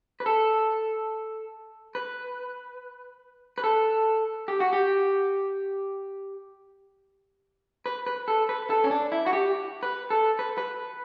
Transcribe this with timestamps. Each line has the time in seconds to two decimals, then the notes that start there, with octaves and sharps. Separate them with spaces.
0.20 B4
0.26 A4
1.95 B4
3.58 B4
3.64 A4
4.48 G4
4.60 F#4
4.73 G4
7.86 B4
8.06 B4
8.28 A4
8.49 B4
8.70 A4
8.84 C#4
8.91 D4
9.12 E4
9.26 F#4
9.33 G4
9.83 B4
10.10 A4
10.39 B4
10.58 B4